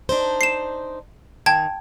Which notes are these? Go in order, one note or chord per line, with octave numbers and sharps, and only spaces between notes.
D4 D#4 C5
C7 E7
D#3 G5 A5 G#6